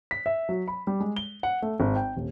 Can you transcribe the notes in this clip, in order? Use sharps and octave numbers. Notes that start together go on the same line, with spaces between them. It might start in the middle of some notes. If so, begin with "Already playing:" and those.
B6
E5
F#3
B5
G3
G#3
G7
F#5
A3
G#1
G5
D#1